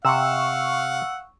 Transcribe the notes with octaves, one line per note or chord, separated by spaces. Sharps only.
C3 F5 F#5 C#6 E6